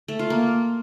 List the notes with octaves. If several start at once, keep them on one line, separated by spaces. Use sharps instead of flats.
A3
F4
A#3